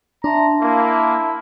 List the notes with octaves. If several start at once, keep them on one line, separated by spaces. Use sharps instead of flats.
D4 E5 A5 A#5 C6
A#3 E4